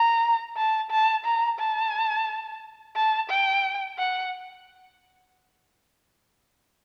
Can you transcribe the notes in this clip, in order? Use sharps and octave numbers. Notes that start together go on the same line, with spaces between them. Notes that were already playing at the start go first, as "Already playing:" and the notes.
Already playing: A#5
A5
A5
A#5
A5
A5
G5
F#5